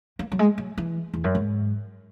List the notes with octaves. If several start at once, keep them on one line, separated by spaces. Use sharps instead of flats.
A#3
F#3
G#3
F#3
E3
E2
F#2
G#2